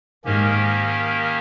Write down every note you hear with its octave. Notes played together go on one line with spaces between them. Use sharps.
G#2 D#3 A#3 C#4 G4 A#4